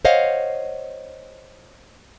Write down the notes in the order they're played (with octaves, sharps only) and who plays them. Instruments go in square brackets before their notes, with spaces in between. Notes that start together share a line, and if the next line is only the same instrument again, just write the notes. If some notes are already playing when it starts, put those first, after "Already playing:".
[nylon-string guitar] C5 C#5 D#5 F5 F#5